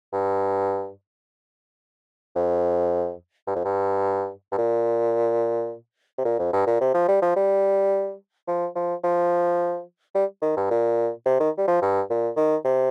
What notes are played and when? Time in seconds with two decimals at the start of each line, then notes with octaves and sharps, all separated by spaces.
0.13 G2
2.35 F2
3.47 G2
3.55 F2
3.65 G2
4.52 G2
4.58 A#2
6.18 C3
6.25 A#2
6.39 F2
6.53 G2
6.66 A#2
6.80 C3
6.94 F3
7.08 G3
7.22 F3
7.36 G3
8.47 F3
8.75 F3
9.04 F3
10.15 G3
10.42 D#3
10.57 G2
10.71 A#2
11.26 C3
11.40 D#3
11.58 G3
11.68 F3
11.82 G2
12.10 A#2
12.37 D#3
12.65 C3